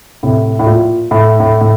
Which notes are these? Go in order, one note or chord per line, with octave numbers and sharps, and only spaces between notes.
A2 C3
A2
A#2
A2
A2
A2